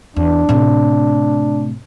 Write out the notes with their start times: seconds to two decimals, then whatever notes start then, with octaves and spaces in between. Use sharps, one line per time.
0.16 E2 D4
0.49 A2 C3